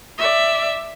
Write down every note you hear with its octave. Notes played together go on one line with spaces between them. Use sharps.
D5 E5